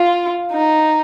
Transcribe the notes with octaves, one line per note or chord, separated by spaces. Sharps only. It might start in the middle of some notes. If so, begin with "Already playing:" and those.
Already playing: F4 F5
D#4